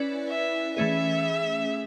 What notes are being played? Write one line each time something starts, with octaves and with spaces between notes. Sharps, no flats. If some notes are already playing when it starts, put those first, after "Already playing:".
Already playing: C#4 E4 B4 D5
E5
E3 A3 C#4 G#4 E5